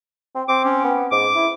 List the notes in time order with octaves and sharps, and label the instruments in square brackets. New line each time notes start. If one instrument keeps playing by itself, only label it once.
[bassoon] C4
[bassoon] C4 [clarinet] D6
[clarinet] C#4
[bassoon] B3
[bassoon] G#2 [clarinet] D6
[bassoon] E4